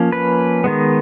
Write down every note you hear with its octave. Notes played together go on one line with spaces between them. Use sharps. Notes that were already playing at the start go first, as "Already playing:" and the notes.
Already playing: F3 A#3 C#4
B4
D#3 G#3 B3